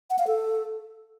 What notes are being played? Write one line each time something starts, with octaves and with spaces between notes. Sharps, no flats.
F#5
F5
A4